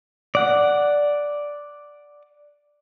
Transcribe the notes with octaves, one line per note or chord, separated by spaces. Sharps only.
D5 F#5